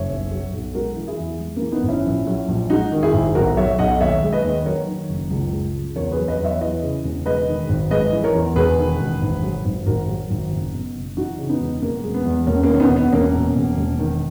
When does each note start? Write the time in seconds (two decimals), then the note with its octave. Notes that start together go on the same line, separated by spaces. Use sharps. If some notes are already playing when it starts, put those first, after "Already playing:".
Already playing: F#1 C#5 E5
0.10 B1
0.31 F#3
0.53 B1
0.74 G#3 F#4 A#4
0.96 E3
1.07 E4 G#4
1.19 E2
1.40 G#3
1.56 A#3
1.61 E3
1.72 B3 D#4
1.83 G#1
1.88 C#4 E4
2.05 A#1
2.27 F#3
2.48 A#1
2.70 G#3 D#4 F#4
2.92 D#3
3.03 E4 G#4
3.13 G#1
3.35 B1 F#4 A#4
3.57 F#3 C#5 E5
3.79 B1 D#5 F#5
4.00 D#2 C#5 E5
4.23 G#3
4.33 B4 D#5
4.44 D#2
4.66 F#3 A#4 C#5
4.87 D#3
5.09 F#1
5.31 C#2
5.52 G#3
5.74 C#2
5.96 E2 A#4 C#5
6.12 G#4 B4
6.18 F#3
6.28 B4 D#5
6.39 E2
6.45 C#5 E5
6.61 E3 B4 D#5
6.82 C#3
7.04 E1
7.26 G#3 B4 D#5
7.48 D#3
7.69 G#1
7.91 G#3 B4 D#5
8.13 E3
8.24 A#4 C#5
8.35 E2
8.56 E1 G#4 B4
8.78 D#3
9.00 E1
9.22 G#1
9.43 F#3
9.65 G#1
9.86 G#1 F#4 A#4
10.08 F#3
10.30 G#1
10.52 F#1
10.74 B2
10.95 F#1
11.17 E3 D#4 F#4
11.38 C#3
11.49 B3 D#4
11.60 E1
11.82 E2 A#3
12.03 G#3
12.14 B3
12.26 E2
12.47 E1 A#3 C#4
12.63 A#3 C#4
12.69 D#3
12.75 C#4
12.80 B3 D#4
12.90 E1
12.96 B3
13.12 E1 A#3 C#4
13.34 B2
13.55 E1
13.77 E1
13.99 D#3